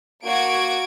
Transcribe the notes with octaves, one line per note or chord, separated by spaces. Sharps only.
A#3 F#4 G#6 D7